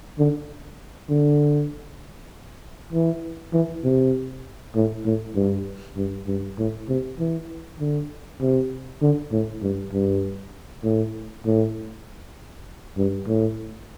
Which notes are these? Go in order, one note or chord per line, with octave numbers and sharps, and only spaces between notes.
D3
D3
E3
E3
C3
A2
A2
G2
G2
G2
A2
C3
E3
D3
C3
D3
A2
G2
G2
A2
A2
G2
A2